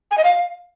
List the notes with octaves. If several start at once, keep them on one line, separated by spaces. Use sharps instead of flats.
G#5
D#5
F5